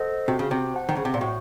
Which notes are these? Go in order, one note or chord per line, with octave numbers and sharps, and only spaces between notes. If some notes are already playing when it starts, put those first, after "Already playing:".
Already playing: A4 C5 D#5 F#5
C3 F#4
C#3
C3
C5 F#5 A5
D#3
C#3
C3
A#2
A2 F#4